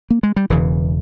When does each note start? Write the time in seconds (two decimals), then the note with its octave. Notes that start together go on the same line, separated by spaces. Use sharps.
0.10 A#3
0.23 G#3
0.36 G3
0.50 E1 E2 C#3 E3